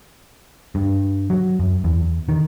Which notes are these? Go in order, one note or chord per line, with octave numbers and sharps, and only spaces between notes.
G2
F#3
F#2
E2
D#3